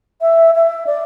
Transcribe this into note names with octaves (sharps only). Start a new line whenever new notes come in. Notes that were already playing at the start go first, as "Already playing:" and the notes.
E5
E5
D5